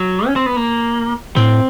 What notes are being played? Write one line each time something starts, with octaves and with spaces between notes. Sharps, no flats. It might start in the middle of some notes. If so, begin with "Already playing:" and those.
Already playing: F#3
C#4
C4
B3
A#3
A2 C4